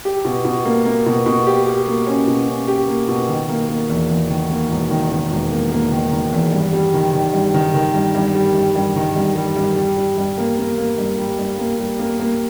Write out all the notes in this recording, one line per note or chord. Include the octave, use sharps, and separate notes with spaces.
G4
B2
B2
A#3
A#3
B2
B2
G4
G4
A#3
C#4
B2
C#4
G4
A#3
B2
D#3
A#3
A#3
E2
E2
D#3
A#3
E1
D#3
D#3
E1
A#3
A#3
D#3
D#3
E2
G2
G3
D#3
D#3
G2
D#3
D#3
G2
G2
G3
G2
G2
D#3
G2
G3
G2
G3
G3
G2
A#3
A#3
A#3
G2
G3
G2
A#3
G3
A#3
A#3